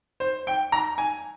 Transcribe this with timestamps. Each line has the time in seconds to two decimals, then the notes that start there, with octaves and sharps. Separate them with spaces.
0.20 C5
0.47 G5
0.72 A#5
0.98 G#5